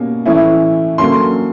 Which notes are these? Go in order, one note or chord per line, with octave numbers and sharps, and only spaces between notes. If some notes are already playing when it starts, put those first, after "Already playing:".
Already playing: B2 G3 A#3 C#4
A2 E3 A3 C#4 E4
D3 F#3 A#3 C#4 C6